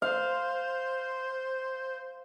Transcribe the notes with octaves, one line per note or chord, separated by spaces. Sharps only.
C5 F5